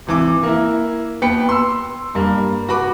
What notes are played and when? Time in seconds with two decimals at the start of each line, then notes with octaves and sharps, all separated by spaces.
0.07 G#1 E3 D6
0.43 A#3 E4
1.22 D#2 B3 G5 B5 C#7
1.49 C6 E6
2.15 G2 A#3
2.69 F#4 B4 B5 D6